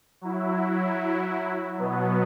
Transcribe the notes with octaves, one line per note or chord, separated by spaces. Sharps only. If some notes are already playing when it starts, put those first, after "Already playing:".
F#3 E4
B2 F#3 B3